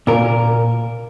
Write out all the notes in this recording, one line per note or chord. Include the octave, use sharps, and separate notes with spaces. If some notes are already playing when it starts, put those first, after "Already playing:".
A#2 A#4